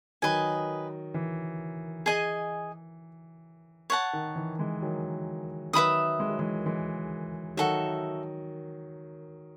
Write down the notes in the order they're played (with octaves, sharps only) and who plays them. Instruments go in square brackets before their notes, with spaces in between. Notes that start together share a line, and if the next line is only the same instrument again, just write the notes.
[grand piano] D#3 F#3 [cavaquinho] B4 D#5 G#5
[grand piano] E3
[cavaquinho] G#4 D#5 G#5
C#5 F#5 A5
[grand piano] D#3
E3
E3 G#3
D#3 F#3
[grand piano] D#3 F#3 [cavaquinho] B4 E5 B5 D#6
[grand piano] G#3
F#3
E3 G#3
E3 G#3
[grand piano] D#3 F#3 [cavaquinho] F#4 A4 E5